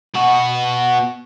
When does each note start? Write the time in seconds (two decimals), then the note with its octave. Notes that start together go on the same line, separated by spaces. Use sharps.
0.14 B2 F#4